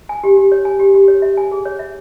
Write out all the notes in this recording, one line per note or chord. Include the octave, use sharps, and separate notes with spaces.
G#5
G4
G4
C#5
G#5
G4
G4
C#5
E5
G#5
G#4
C#5
E5